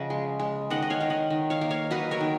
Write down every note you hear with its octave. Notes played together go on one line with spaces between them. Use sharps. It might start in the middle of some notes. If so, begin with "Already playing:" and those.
Already playing: C#3 F3 C#5 D#5 F#5
G#3
G#3
D#3 D#5 F#5
D#5
C#5 F5
D#3 F5
D#5 F#5
D#3
C#5 F5
A#3
C#5 F5
F#3 B4 D#5
A#4 C#5
D#3